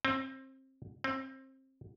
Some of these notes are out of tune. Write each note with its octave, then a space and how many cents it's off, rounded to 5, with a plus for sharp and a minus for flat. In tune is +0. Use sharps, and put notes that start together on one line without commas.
C4 +25
C4 +25